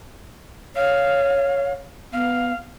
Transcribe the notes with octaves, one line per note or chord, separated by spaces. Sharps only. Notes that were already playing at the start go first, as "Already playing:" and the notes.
C#5 F5
B3 F5